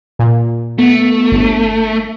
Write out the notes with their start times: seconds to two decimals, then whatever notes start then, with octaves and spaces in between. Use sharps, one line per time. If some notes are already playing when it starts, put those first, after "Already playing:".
0.19 A#2
0.78 A3 B3
1.32 G1